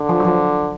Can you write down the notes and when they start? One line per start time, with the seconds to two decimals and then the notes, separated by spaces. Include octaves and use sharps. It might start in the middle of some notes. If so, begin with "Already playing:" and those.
Already playing: D3
0.09 F3
0.20 F#3
0.25 F3